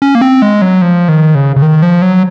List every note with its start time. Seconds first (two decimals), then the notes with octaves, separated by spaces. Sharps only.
0.02 C#4
0.15 A#3
0.21 C4
0.42 G#3
0.62 F#3
0.82 F3
1.08 D#3
1.35 C#3
1.56 C#3
1.62 D#3
1.82 F3
2.02 F#3